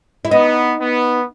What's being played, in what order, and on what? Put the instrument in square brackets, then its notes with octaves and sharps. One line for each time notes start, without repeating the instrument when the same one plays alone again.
[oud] E4
[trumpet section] B3 [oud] D#4
[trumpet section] B3